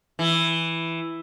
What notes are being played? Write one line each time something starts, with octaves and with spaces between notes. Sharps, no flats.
E3